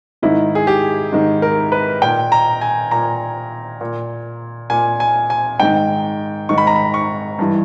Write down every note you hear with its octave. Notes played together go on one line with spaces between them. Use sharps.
G#2 D#3 E4
G#4
G4
G#2 D#3
A#4
B4
A#2 G5
A#5
G#5
A#2 A#5
A#2
A#2 G#5
G#5
G#5
G#2 D#3 G5
G#2 D#3 C#6
B5
A#5
B5
C#6
G2 E3